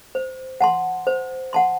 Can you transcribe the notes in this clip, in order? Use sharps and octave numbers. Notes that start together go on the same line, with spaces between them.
C5
F#5 A5 C6
C5
F#5 A5 C6